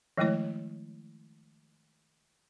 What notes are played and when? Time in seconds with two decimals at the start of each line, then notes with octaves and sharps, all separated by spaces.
0.18 D#3 F3 G#3 A3 E4 C#5